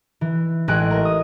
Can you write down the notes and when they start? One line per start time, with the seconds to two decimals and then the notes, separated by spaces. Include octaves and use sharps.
0.21 E3
0.68 A1 G#3 G#4 F#6 D7
0.91 A#4
1.05 D#6